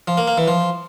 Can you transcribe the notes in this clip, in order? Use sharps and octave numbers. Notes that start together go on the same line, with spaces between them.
F3
A#3
A#3
E3
F3